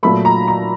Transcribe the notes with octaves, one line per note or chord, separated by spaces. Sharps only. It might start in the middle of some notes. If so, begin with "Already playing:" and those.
A#2 F#3 A3 B5
A#5
A#5